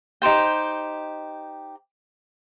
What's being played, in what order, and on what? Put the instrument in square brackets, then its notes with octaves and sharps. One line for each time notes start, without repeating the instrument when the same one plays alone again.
[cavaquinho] D#4 G4 C5 G5